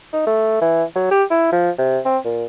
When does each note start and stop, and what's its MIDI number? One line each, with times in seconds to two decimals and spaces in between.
0.13 0.24 63
0.27 0.61 57
0.61 0.84 52
0.95 1.06 54
1.11 1.24 67
1.31 1.50 64
1.52 1.71 53
1.78 1.99 48
2.05 2.18 60
2.25 2.45 46